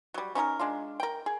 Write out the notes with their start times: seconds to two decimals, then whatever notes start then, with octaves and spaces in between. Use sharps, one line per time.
0.14 F#3 G3
0.35 C#4 D#4 F4 A#4
0.59 G#3 D4 F4
1.00 A#4 G5
1.26 G#4